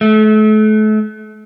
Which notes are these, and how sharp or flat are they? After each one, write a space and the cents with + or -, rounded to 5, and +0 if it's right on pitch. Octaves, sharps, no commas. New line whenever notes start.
A3 -35